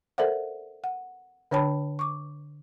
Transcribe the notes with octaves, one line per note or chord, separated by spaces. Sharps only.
A4 A#4 C5 D5 E5 F#5
F#5
D3 D4 C#5 G5 A5 B5
C#6 D6